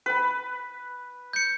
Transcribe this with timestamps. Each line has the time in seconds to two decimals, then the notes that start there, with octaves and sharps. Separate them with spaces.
0.06 B4 B5
1.33 G6 C#7